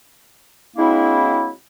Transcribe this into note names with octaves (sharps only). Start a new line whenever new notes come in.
F#3 G#3 A#3 C4 D4 E4